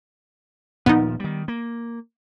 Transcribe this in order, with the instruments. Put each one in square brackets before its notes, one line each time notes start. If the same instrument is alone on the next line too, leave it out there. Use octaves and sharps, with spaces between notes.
[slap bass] D#1 A#2 F3 [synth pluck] B3 D#4
[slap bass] D#3 G3
A#3